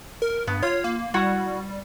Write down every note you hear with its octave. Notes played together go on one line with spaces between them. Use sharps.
A#4
G2 B3
F4 C#5
A#3
G3 E4 F#4 F#5